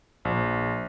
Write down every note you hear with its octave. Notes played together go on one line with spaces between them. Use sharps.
A#1